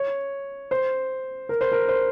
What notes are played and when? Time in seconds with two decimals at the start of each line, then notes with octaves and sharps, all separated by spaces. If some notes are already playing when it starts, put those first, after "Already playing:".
Already playing: C#5
0.71 C5
1.49 A#4
1.61 C5
1.72 A#4
1.88 C5